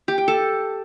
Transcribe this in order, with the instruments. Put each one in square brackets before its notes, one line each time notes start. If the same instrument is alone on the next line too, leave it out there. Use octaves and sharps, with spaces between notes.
[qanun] G4
G5
A4